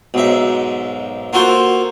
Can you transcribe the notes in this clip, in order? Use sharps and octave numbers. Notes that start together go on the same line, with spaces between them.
B1 G#2 E5
A#3 F4 F#4 A4 C5